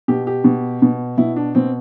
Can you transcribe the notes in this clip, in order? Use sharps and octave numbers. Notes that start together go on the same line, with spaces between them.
B2 G4
G4
B2
B2
B2 E4
D4
B2 C4